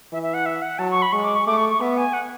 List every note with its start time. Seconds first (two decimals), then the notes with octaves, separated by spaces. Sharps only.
0.12 E3 E5
0.23 E5
0.34 F#5
0.46 E5
0.62 F#5
0.79 F#3 A5
0.91 C#6
1.02 B5
1.12 G#3 C#6
1.24 D6
1.35 C#6
1.47 A3 D6
1.57 C#6
1.69 C#6
1.80 B3 E5
1.97 G#5
2.13 F#5